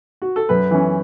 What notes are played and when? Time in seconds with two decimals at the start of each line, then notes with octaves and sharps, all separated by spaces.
0.22 F#4
0.36 A4
0.49 F#2 B4
0.71 E3 C#4